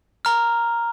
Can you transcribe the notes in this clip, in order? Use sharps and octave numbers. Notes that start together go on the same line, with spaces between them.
A#5 F6